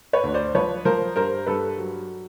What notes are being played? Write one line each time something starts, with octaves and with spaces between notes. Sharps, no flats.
B4 C#5
D2
C5 D5
F3 B4 C#5
F3 A#4 C5
G2 A#4 C5
G2 A4 B4
F#3